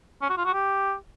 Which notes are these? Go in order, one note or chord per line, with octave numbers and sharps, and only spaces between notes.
C#4
F#4
F4
F#4
G4